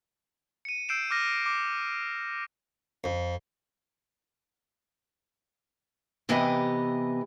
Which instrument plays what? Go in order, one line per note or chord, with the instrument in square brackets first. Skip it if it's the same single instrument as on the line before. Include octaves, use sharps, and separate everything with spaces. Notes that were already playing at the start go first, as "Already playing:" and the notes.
[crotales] C#7 D#7
E6 G6 C7 D7 E7
D6 F6 A#6
D6
[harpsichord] F2
[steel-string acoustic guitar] C3 E3 B3 G4 D#5